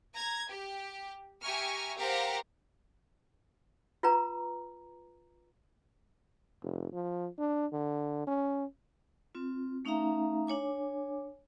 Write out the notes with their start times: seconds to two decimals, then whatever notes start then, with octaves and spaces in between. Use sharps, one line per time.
0.15 A#5 G#6
0.49 G4
1.41 G4 E5 G#5 A#5 C#6 F6
1.97 G4 A#4 C5 F5 F#5 A#5
4.03 F4 B4 A#5
6.63 F1
6.93 F3
7.38 D4
7.73 D3
8.27 C#4
9.35 C4 F4
9.85 A3 C#4 D#4 E5 F5 A#5
10.47 D4 C#5 G#5 D6